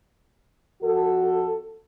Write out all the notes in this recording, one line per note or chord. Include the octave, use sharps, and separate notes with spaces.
F2 F#4 A4